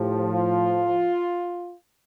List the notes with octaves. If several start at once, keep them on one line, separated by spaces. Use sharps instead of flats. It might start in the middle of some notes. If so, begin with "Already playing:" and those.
Already playing: A2 F3 G4
F4